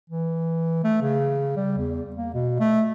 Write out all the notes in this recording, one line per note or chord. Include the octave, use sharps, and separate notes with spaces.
E3
A3
C#3
G3
E2
A#3
B2
A3